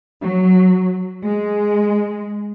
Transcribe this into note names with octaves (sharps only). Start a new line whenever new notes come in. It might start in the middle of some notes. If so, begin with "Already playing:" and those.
F#3
G#3